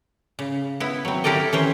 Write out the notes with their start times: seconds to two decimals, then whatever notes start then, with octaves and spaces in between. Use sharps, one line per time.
0.39 C#3
0.80 B3 E4
1.05 F#3 C4
1.24 E4 G4 A4 A#4 D5 D#5
1.53 E3 C#4 C5